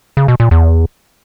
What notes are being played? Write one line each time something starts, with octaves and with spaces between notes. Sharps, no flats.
C#3
B2
A#2
E2